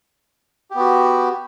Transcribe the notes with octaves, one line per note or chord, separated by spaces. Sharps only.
B3 F#4 G4